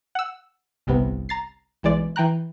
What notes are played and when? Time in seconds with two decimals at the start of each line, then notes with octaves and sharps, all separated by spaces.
0.15 F#5 E6
0.87 G1 C2 C3 B3
1.29 A#5 A6 C7
1.83 B1 E3 G#3 D5
2.16 E3 G5 A#5 F#6